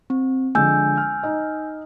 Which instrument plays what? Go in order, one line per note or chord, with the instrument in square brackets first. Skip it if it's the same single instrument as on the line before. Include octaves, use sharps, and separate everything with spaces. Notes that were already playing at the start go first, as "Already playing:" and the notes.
[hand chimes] C4
[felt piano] D3 F3 G#3 [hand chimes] G#5 E6 G6
[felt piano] F6
D#4 D#5